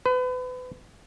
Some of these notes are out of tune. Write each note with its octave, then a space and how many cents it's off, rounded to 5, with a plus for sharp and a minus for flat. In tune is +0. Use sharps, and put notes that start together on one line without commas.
B4 +35